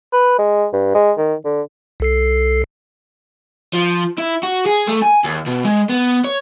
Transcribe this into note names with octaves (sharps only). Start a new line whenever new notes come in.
B4
G#3
G2
G#3
D#3
D3
C2 A4 C7
F3
E4
F#4
G#4
A3
G#5
D#2
B2
G#3
B3
C#5